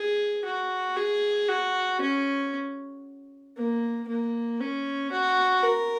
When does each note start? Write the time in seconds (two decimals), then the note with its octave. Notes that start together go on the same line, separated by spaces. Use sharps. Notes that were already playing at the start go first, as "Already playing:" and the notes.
Already playing: G#4
0.45 F#4
0.97 G#4
1.49 F#4
2.01 C#4
3.57 A#3
4.08 A#3
4.60 C#4
5.12 F#4
5.63 A#4